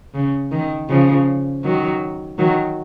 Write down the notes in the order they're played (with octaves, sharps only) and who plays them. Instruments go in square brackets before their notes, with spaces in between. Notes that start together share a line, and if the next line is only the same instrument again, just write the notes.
[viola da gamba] C#3
D#3
C#3 F3
D#3 F#3
D#3 F#3